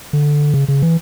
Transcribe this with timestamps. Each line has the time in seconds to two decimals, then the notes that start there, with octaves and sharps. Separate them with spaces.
0.13 D3
0.54 C#3
0.68 C#3
0.82 E3